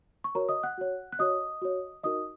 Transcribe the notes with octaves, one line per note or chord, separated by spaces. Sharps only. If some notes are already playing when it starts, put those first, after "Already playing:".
C#6
F#4 A#4 C#5 A#5
D#5 D#6
F#5 F#6
F#4 C#5
F#6
F#4 C#5 D#5 D#6
F#4 C#5
D#4 F#4 A#4 D#5 D#6